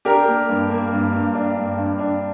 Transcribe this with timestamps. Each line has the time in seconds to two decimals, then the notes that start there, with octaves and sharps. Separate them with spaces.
0.05 D4 G4 A#4
0.28 A#3
0.49 G2
0.70 A#3
0.92 G2
1.13 G2
1.35 D4
1.57 G2
1.77 G2
1.99 D4